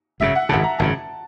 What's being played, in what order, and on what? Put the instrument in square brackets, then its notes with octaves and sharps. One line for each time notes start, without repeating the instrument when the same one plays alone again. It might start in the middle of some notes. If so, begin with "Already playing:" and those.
[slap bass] G#1 F#2 C#3 [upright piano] E5
[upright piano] F#5
[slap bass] G#1 F#2 C#3 [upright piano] A5
[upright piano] A#5
[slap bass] G#1 F#2 C#3 [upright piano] A5